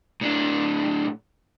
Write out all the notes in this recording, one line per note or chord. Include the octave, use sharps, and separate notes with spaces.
A2 D4